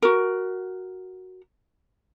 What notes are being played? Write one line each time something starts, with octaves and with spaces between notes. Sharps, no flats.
F#4 A#4